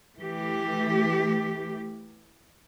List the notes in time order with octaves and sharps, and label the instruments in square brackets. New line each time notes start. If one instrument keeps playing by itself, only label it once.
[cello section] E3 A3 G4